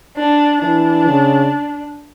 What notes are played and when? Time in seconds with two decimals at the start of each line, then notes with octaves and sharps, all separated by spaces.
0.17 D4
0.62 E3 D4
1.07 C#3